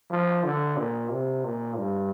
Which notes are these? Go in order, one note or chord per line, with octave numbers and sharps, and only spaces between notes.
F3
D3
A#2
C3
A#2
G2